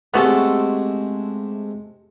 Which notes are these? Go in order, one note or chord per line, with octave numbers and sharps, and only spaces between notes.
C3 G#3 A3 B3 F#4 A4